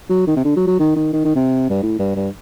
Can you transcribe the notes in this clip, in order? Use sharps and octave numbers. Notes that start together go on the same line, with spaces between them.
F#3
D#3
C3
D3
F#3
F#3
D#3
D#3
D#3
D#3
C3
G2
A2
G2
G2